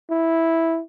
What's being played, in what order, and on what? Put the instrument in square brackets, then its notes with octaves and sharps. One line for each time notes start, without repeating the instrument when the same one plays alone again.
[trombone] E4